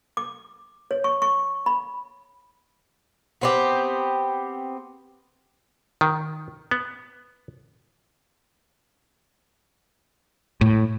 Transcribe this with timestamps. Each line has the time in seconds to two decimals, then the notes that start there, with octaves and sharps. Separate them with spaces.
0.17 D6
0.91 C#5
1.04 C#6
1.22 C#6
1.66 B5
3.41 B3 C4 G4
6.01 D#3
6.71 B3
10.61 A2